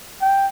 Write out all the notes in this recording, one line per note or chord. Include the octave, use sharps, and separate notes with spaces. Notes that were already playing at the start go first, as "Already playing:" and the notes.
G5